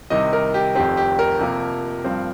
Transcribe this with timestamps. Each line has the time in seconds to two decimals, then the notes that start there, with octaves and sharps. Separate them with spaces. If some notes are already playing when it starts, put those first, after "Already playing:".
0.10 C2 C3 D#3 D#5
0.33 A#4
0.54 G4
0.75 F1 F2 D#3 C4 G4
0.97 G4
1.19 A#4
1.39 F2 C3 F3 A#3
2.04 G2 F3 C4